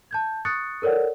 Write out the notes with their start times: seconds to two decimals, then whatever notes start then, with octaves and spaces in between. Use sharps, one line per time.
0.11 A5 G6 G#6
0.45 C#6 D#6 F#6 A6 C#7
0.82 A4 A#4 C#5 D5 F#5